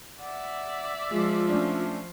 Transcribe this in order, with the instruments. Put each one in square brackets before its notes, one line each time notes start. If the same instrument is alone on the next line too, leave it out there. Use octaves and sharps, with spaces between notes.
[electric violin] D5 E5 [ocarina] F#5
[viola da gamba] F3 [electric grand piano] G#3 [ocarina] F4
[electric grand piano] A3 C#4 D4